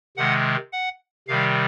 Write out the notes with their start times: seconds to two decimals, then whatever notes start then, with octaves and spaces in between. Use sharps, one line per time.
0.17 C3 D#3 G#3 F#5
0.73 F#5
1.28 C3 D#3 G3 F5